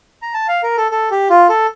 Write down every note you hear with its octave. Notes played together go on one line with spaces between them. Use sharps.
A#5
A5
F5
A#4
A4
A4
G4
F4
A4